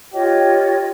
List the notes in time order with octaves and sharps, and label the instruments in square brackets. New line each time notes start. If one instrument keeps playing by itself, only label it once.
[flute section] F4 C#5 D#5 [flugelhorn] G4